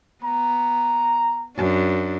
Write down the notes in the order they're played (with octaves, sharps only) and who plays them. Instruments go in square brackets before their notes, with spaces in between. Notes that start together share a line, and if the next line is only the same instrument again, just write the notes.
[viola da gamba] B3 [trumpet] A#5
[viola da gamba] F#2 D4